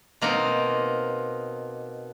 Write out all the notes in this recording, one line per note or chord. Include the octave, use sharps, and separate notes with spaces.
B2 A#3 C4 D#4